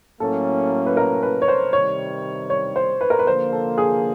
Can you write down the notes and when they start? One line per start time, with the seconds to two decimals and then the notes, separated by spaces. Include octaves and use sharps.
0.20 A2 F#3 A#3 C#4 A4
0.86 B4
0.97 A#4
1.23 B4
1.42 C#5
1.48 C5
1.73 C3 D#3 G3 C#5
2.50 C#5
2.76 C5
3.01 B4
3.10 A#4
3.19 B4
3.27 D3 F3 A#3 C5
3.52 A4
3.78 G#4